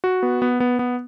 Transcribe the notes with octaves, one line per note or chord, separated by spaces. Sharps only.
F#4
B3
B3
B3
B3